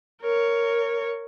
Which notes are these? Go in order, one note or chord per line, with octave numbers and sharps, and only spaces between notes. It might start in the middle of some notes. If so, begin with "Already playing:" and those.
A#4 C#5